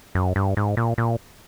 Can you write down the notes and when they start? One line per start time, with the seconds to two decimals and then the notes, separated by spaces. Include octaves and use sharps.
0.15 F#2
0.36 G2
0.57 G#2
0.77 A#2
0.98 A#2